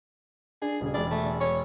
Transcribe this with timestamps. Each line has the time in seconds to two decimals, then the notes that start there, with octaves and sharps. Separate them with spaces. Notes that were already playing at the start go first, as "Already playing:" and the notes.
0.62 D4 G#4
0.81 D#1 C#3
0.94 E1 G#3 D5
1.11 A3
1.40 C#5